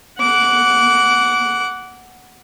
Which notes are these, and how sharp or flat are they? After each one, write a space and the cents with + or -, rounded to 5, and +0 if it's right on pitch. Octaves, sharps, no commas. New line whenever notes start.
F#5 +0 D6 -25